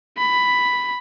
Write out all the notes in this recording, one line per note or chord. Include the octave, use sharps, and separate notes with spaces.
B5